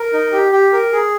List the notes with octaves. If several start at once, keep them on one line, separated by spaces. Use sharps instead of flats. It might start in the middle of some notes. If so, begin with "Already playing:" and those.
Already playing: A#4
D#4
G4
G4
A#4
G#4